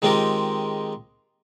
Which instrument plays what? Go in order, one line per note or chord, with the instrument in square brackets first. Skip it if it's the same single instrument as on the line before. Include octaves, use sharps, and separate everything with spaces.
[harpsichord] D#3 G#3 C4 F4 G4 A#4